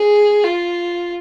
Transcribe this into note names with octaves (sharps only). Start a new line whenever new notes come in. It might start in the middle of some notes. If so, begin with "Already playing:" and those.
Already playing: G#4
F4